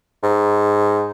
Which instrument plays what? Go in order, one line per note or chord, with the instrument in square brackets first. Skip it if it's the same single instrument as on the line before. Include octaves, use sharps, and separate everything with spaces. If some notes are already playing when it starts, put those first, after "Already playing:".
[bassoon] G#2